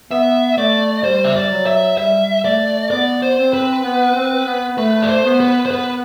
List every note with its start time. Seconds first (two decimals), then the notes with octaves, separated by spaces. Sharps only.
0.11 B3 E5
0.58 A3 D5
1.04 G3 C5
1.24 E5
1.36 D5
1.51 F#3
1.66 E5
1.97 G3 E5
2.44 A3 D5
2.91 B3 D5
3.22 C5
3.38 C4
3.53 B4
3.84 B3
4.15 C4
4.46 B3
4.77 A3 B4
5.02 D5
5.09 C5
5.24 B3
5.40 B4
5.66 C5
5.71 B3 B4